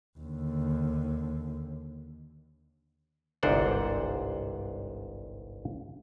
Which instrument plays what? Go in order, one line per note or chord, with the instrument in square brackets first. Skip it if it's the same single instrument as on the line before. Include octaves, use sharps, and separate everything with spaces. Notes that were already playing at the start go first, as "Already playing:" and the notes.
[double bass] D#2 D3
[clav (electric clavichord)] G1 C2 G#2 D4 C5 F#5